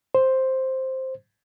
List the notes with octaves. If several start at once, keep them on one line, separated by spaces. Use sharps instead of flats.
C5